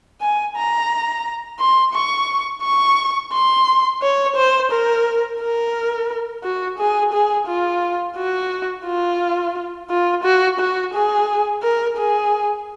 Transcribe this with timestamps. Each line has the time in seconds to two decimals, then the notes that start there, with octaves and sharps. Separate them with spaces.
0.21 G#5
0.56 A#5
1.59 C6
1.94 C#6
2.63 C#6
3.32 C6
4.02 C#5
4.36 C5
4.72 A#4
5.41 A#4
6.43 F#4
6.79 G#4
7.13 G#4
7.47 F4
8.17 F#4
8.86 F4
9.90 F4
10.24 F#4
10.60 F#4
10.94 G#4
11.63 A#4
11.97 G#4